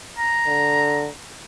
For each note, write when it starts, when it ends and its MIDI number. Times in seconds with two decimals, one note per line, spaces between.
0.18 1.08 82
0.46 1.08 50